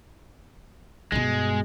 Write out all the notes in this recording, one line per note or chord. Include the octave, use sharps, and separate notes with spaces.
G2 B2 G#3